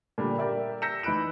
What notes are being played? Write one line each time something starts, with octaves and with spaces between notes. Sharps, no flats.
A#2 D3 G3
G4 A#4 D5 E5
E6 G6 A#6 B6 C#7 E7
E3 D#4 B5 F#6 D7 E7